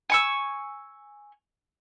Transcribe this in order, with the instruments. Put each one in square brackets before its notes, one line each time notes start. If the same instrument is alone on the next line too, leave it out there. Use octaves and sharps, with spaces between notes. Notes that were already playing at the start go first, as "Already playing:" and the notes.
[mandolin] G#5 C#6 E6